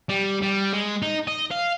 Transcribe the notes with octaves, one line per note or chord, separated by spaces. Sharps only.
G3
G3
G#3
D#4
D#5
F5